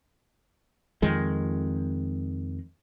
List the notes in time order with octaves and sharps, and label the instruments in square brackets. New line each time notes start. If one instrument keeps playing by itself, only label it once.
[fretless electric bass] F2 D#3 G#3